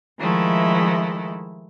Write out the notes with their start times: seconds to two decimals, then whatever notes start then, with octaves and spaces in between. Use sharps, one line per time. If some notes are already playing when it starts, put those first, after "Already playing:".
0.19 D#3 F3 G#3 A3 E4